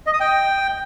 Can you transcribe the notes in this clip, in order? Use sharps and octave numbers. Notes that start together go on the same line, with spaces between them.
D#5
D#6
G5